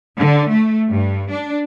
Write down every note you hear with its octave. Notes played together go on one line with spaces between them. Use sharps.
D3
A3
G2
D4